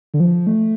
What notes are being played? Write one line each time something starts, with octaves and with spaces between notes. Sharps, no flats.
D3
F3
A3